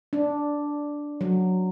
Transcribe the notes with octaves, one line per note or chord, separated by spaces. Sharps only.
D4
F#3